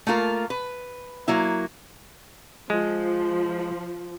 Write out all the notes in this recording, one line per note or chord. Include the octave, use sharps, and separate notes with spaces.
A3 A#3 F4 A#4
B4
F#3 A#3 E4
F3 G#3